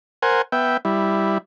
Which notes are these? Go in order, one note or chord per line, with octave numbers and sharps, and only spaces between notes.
A#4 C5 F#5 G#5
B3 E5 G5
G3 E4